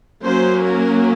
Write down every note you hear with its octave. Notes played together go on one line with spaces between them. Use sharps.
F#3 A#3 C#4 C5
A#4